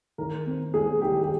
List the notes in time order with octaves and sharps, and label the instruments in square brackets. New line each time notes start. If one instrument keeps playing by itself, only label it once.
[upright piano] D#3 A#4
C4
G#3 G#4
D#3 G4
G4